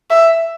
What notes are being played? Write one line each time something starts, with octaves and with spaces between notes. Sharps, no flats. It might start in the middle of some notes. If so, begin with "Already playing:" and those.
E5